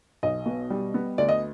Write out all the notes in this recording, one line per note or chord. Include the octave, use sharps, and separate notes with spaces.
B1 D#5
B2
G3
B3
D2 D5
D#5